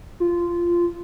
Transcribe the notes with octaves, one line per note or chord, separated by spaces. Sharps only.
F4